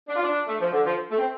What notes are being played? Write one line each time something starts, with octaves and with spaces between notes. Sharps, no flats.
D4
F4
D4
A3
F3
D3
F3
A3
C4